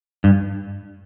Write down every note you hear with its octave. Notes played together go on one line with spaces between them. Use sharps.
G2